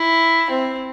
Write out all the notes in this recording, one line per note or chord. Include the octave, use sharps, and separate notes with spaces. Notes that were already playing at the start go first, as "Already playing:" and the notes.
Already playing: E4
C4